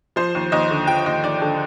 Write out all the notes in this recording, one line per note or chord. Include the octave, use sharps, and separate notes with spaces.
F3 C5
D#2
D#2 D#5
D3
F3 G5
D#2 D#5
D#2 D5
D3 A4